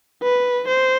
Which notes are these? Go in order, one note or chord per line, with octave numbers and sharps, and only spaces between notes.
B4
C5